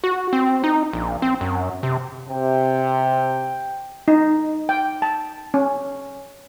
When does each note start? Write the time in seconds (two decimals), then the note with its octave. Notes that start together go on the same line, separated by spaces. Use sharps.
0.04 F#4
0.33 C4
0.64 D#4
0.93 A#1
1.22 C4
1.41 F#2
1.83 C3
2.29 C3 G5
4.08 D#4
4.69 G5
5.02 A5
5.54 C#4